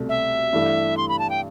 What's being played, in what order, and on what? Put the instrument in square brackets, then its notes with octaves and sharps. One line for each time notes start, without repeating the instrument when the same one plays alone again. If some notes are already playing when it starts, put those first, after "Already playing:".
Already playing: [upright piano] C2 B2 A3
[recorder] E5
[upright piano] G2 E3 A3 D4
[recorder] C6
B5
A5
G5